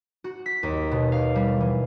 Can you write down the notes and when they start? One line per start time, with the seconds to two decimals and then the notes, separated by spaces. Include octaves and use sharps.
0.24 F#4
0.46 B6
0.63 D#2
0.91 B2
1.12 F5
1.36 G3
1.61 E3